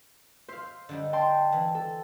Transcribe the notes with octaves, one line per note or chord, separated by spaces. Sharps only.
C5 E5 F5
D3 G3 D#4
G5 A5 C6
E3
A4